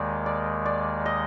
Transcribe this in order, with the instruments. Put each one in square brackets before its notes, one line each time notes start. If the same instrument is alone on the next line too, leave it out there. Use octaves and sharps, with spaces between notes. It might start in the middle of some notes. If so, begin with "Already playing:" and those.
Already playing: [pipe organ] D#2 D#3 G#3 [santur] D5
[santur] D5
D5
D#5